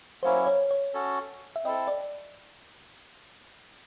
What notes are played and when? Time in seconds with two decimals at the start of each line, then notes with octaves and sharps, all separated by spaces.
0.23 F#3 A#3 C#4 E4 C5
0.47 C#5
0.71 C#5
0.94 C#4 F#4 A4
1.56 E5
1.64 C4 E4 A4 D#5
1.88 D5